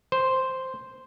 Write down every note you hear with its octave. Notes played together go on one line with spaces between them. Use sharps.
C5